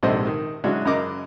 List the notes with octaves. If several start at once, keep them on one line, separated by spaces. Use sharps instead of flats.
A#1 G#2 C3 A4 C5 D#5
D#3
F#3 G#3 C#4 D4 E4 F#4
F#2 C#3 A#4 D#5 D6